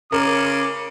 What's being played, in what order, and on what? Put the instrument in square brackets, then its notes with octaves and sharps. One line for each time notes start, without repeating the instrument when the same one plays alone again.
[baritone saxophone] C#3 [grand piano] A#4 [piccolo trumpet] D6